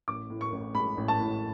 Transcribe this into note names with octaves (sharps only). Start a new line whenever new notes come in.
A1 D6
A2
C#6
A1
G#3 B5
A1
A5
A2